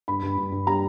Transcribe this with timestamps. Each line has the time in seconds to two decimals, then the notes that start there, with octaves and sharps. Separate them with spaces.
0.08 G2 B5
0.23 G2
0.37 G2
0.52 G2
0.67 G3 A#5